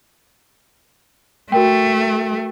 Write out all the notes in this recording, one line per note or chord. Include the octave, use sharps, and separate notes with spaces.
A3 F#4 A#4 G5